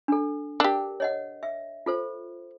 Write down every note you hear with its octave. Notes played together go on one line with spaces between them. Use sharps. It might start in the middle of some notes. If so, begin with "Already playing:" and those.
D4 A4
D4 G4 A#4
C#5 D#5 F#5
E5
F4 A4 C5